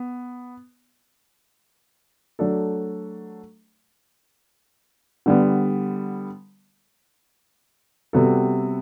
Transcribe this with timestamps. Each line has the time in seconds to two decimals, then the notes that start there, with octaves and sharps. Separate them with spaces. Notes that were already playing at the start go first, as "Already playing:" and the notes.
Already playing: B3
2.39 F#3 A3 D4 A4
5.26 D3 G3 B3
8.13 C3 G3 B3 F#4 A4